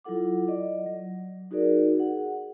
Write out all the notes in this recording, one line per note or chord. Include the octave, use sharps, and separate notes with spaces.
F#3 E4 F4 A4 F#5 D6
D5 D#5
F#3
D#4 F#4 G#4 A#4 D5
G#4 F#5